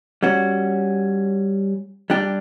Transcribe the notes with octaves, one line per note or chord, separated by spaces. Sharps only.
G3 C#4 F#4
G3 D4 G4